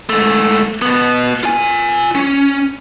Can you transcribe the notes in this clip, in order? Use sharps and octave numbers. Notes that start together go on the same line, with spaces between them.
G#2 A3
B2 B3
F4 G#5
C#4